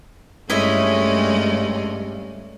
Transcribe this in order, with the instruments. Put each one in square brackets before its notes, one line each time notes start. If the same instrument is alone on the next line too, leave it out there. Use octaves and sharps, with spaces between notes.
[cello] G2 [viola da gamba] G#3 A3 C#4 [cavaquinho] E4 D#5 E5